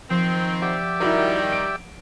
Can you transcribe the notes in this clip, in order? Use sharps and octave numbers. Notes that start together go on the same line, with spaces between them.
D#3 F3 C4 G5
G4 D5 E5 F#5
D#3 G3 E4 F#4 A#4
D7